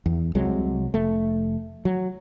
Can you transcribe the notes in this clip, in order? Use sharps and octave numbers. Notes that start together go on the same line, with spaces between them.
E2
C2 C3 F#3 G#3
F1 A3
F#3